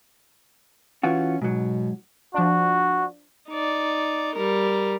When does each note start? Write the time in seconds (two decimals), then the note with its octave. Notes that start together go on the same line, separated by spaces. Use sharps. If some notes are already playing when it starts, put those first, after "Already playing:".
1.03 E3 C#4 F4 F#4
1.42 G#2 B2 F#3
2.34 F3 D4 F#4
3.49 D#4 D5
4.35 G3 A#4